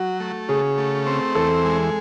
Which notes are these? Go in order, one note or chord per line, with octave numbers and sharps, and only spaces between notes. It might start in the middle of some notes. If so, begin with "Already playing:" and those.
Already playing: F#3 F#4
A3
C#3 G#4
A3
C4
E2 A4
G#3